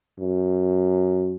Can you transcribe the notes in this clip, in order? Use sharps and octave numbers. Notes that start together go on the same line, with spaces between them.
F#2